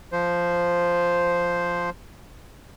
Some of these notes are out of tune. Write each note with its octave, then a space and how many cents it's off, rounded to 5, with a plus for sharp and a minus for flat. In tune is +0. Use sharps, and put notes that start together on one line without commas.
F3 +0 C5 +0